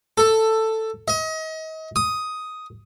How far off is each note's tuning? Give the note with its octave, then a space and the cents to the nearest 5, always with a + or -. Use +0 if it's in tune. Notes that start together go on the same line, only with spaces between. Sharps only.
A4 +10
D#5 +35
D#6 +5